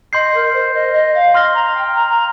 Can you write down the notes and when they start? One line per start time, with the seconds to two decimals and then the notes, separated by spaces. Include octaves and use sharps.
0.13 D#5 C6 G6 C7
0.34 A#4
0.53 C5
0.73 D#5
0.93 D#5
1.14 F5
1.34 C6 F6 A#6 G7
1.54 A#5
1.75 G5
1.94 A#5
2.09 A#5